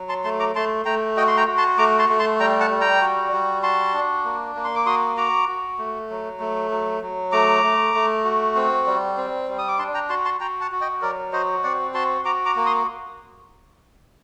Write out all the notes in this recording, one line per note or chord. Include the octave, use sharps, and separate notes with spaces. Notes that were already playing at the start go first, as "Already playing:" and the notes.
Already playing: F#3
A5 C6
A3 A5 C6
A#5 D6
A3 A5 C6
A3 G5 A#5
F#4 D#5 G5
C6
G5 A#5
F#4
A5 C6
A3 A#5 D6
A5 C6
A3
A5 C6
G3 G5 A#5
F#5 A5
G3
G5 A#5
F#4
G3
F#4 A5 C6
D4
A#3
A#3
C6
D6
F#4 C6 D#6
F#4 A#5 D6
F#4
A3
F#3
A3
F#3
F#3
A3 A#5 D6
A3
A3
F#4
C4
G3
C4
G3
D#6
D6
D4 A5 C6
G5 A#5
F#4 A5 C6
A5 C6
F#4 G5 A#5
F#5 A5
F#4
D#5 G5
F#3 A#4 D5
F#4 C5 D#5
C4 D5 F#5
F#4 A5 C6
F#4 A#5 D6
A#5 D6
A#3
C6 D#6